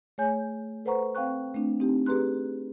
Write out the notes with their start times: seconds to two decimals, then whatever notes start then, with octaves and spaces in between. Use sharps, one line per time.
0.18 A3 G#4 C#5 G#5 G6
0.85 A4 B4 C5 F#5 A#5 C#6
1.15 C4 F5 G5 C#6 F#6
1.55 A3 C4 D4
1.80 C4 D#4 G4
2.06 G4 G#4 B4 A#5 C6 F#6